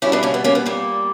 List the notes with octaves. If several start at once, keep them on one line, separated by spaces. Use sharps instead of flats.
B2 G3 C#4 E4
B3 D4
A#3 C#4
B3
A#3 C#4
B3
A#2 G3 A#3